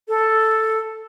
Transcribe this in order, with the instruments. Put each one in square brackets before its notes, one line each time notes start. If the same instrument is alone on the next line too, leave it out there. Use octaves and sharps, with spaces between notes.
[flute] A4